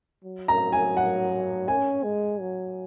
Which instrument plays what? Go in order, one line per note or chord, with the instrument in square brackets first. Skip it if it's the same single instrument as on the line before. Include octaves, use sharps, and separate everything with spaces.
[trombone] F#3
[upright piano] A#5
G#5
F#5
[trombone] C#4 [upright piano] G#5
[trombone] G#3
F#3